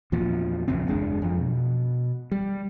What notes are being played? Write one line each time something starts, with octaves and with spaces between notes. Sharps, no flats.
E2 A#2 F3
A#1 F2 C#3 C4
F#1 E2 G#3 D4
F2 F3
B2
G3